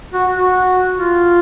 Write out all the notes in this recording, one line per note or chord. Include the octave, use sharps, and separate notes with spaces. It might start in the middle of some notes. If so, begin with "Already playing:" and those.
F#4
F#4
F4